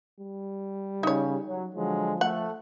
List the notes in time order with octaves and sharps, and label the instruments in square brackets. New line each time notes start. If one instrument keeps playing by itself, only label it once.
[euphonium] G3
[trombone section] C#3 [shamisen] D#4 C#5
[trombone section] F#3
[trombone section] D3 F#3 G#3 [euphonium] F3
[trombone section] A3 [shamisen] F#5